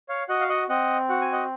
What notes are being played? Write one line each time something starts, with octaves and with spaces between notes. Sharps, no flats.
C#5 F5
F#4 D#5 F#5
F5
D#5 F#5
C4 D#5 F#5
F#4 F#5
G#5
D#5 F#5